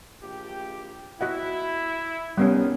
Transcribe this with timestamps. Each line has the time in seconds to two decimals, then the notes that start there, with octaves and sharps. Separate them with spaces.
0.23 A#1 G4
1.21 E4 F#4 D#5 F#5
2.37 A1 D#3 G3 B3 C#4